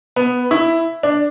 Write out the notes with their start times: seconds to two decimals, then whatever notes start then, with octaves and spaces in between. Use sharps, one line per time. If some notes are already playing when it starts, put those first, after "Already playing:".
0.16 B3
0.51 E4
1.03 D4